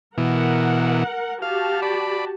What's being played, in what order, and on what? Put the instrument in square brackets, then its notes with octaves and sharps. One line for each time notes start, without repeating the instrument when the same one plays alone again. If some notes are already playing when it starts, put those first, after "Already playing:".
[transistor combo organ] B2 E3 [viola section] A#4 F#5
[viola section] F#4 G4 A5 [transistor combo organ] F5
[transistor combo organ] D5 B5